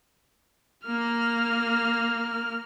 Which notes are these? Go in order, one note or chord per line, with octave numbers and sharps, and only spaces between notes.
A#3 F6